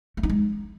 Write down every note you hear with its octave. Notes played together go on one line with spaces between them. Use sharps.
A3
D#4
G#3